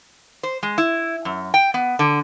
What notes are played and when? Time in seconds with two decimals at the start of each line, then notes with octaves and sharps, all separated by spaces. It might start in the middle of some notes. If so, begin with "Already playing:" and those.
0.43 C5
0.63 G#3
0.78 E4
1.25 F#2
1.54 G5
1.74 B3
1.99 D3